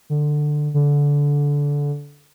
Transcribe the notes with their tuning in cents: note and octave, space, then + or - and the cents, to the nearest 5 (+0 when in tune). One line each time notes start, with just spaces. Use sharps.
D3 +15
D3 -20